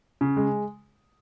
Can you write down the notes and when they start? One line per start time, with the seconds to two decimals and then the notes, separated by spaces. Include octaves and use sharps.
0.21 C#3
0.37 G#3